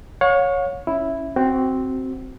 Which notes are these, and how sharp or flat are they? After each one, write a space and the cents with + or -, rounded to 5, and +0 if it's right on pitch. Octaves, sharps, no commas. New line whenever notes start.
C#5 +0 F5 +45
C#4 +0 E4 +0
C4 +0 F#4 +20